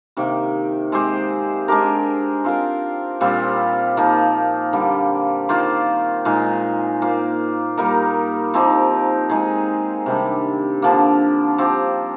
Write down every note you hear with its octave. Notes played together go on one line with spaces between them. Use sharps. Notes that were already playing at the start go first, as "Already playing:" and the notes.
C3 D#3 A#3
G#3 C4 G4 C5
G#3 D4 G4 A#4
C4 F4 A#4
A#2 G3 C4 F4
F3 A#3 D#4
D3 G3 A#3
D#3 A#3 F4 C5
A#2 G#3 D#4
A#3 F4 C5
G3 A#3 D#4 A#4
F3 C4 D#4 G4
G#3 D#4 G#4
C3 D#3 G3 D4
D3 F3 A#3
F3 C4 G4